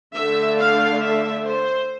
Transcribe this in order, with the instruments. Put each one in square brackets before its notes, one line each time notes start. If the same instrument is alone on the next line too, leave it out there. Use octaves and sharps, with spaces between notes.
[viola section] D3 A3 D4 E5
F5
E5
C5